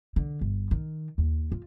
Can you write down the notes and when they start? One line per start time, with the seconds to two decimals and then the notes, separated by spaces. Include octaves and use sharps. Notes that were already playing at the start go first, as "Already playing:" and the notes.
0.16 D3
0.41 G1
0.71 D#3
1.18 D#2
1.52 F4